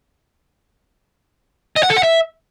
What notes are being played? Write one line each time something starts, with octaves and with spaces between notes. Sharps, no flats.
D#5
F#5
A4
F#5
E5